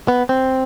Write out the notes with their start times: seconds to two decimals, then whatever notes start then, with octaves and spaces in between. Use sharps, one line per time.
0.08 B3
0.29 C4